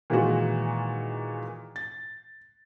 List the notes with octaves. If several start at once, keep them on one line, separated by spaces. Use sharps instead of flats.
A#2 D#3 E3 G#3 F4 F#4
A6